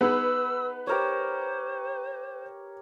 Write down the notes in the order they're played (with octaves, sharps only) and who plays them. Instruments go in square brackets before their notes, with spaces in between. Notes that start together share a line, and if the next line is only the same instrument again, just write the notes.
[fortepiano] B3 D#4 G#4 [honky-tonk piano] B4 [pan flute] E6
[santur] G4 A#4 C#5 [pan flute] C5